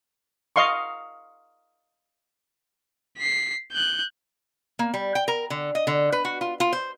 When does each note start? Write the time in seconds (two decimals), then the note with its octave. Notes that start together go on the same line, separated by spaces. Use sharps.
0.56 D#5 F5 C6 C#6
3.18 B6 C7
3.72 F#6 G6
4.79 A#3
4.94 G3
5.15 G5
5.28 A#4
5.50 D3
5.75 D#5
5.87 D3
6.12 B4
6.25 F#4
6.41 F4
6.60 F4
6.73 C5